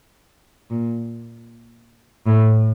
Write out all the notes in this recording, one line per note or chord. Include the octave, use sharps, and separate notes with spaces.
A#2
A2